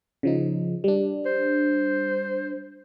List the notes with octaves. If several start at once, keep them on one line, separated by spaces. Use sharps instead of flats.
C#3 F3 D#4
G3 D4
C5